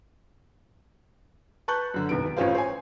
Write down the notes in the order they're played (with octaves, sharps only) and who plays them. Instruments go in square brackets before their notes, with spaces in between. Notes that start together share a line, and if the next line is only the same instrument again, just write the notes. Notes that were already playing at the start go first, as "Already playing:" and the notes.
[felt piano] B4 A5 C#6 F#6 G6
F#2 D3
E1 C2 D#3 B3 D7
A1 A2 C#4 F4 C5 F5
C5 C#5 G#5